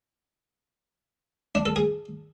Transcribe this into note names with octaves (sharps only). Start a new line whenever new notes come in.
D4
A4
G#4